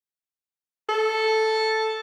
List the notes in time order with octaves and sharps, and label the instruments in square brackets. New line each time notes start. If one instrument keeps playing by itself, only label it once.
[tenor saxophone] A4